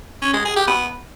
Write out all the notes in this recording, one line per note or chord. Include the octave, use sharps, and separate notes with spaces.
C#4
G#3
G#4
G4
B3